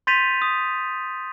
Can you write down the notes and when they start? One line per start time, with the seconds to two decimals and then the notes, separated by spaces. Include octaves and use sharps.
0.07 C6 G6 A6 B6 D#7 F7
0.42 D#6